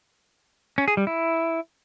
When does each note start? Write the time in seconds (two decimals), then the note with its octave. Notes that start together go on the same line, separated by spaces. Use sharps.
0.78 C#4
0.88 G#4
0.97 G3
1.07 E4